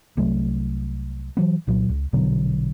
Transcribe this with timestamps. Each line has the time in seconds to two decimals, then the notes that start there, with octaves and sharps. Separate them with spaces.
0.17 C2 F#3 A3
1.37 E3 F#3 B3
1.67 C2 A#2 F#3
1.89 C#2
2.13 A#1 B2 D3 F#3